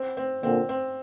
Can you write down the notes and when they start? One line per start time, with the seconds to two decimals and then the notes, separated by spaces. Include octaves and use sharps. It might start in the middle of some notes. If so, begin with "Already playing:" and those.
Already playing: C4
0.17 C4
0.43 A#2 D3 C4
0.69 C4